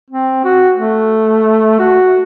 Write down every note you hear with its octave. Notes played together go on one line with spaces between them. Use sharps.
C4
F#4
A3
F#4